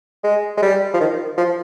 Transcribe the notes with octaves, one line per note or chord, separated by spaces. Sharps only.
G#3
G#3
G3
F3
D#3
F3